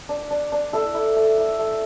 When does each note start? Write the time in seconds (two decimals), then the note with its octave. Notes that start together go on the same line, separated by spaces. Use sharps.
0.09 D4
0.30 D4
0.52 D4
0.73 E4 A4
0.94 E4
1.16 A3
1.38 E4
1.59 A3